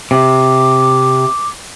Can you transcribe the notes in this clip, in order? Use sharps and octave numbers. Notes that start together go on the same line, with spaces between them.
C3 D6